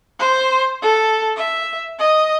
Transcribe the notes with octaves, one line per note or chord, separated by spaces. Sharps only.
C5
A4
E5
D#5